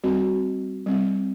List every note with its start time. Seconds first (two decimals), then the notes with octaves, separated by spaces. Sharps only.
0.04 G3 C4 F#4
0.86 G3 C4